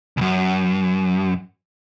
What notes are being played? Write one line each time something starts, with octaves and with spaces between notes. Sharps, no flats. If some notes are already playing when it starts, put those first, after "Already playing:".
C#2 F#2